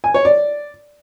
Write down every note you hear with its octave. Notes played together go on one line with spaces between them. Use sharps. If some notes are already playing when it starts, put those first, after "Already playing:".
G#5
C#5
D5